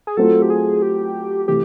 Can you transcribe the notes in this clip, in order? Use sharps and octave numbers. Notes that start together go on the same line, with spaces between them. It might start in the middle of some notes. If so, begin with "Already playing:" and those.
G#4
F#3 A3 C4 F4 A4
G4
G#4
G4
C3 E3 A3 G4